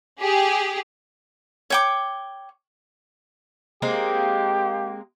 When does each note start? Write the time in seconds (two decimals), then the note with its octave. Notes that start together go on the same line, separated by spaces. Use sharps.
0.19 G4 G#4
1.70 C#5 G5 D6
3.82 G#3 A#3 C4 G4